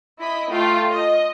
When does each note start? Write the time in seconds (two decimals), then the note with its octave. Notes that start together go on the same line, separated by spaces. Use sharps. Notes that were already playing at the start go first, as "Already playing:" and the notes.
0.18 E4 D#5 B5
0.51 A3 F4 G5
0.91 D#5